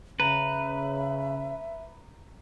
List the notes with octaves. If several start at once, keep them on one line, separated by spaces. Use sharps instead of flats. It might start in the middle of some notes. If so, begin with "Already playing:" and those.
C#3 B4 E5 A#5